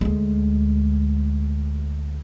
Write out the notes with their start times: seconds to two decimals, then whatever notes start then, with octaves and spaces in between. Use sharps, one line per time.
0.01 D2 G#3